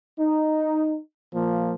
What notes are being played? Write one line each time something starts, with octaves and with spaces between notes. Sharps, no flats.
D#4
A#2 F3 A#3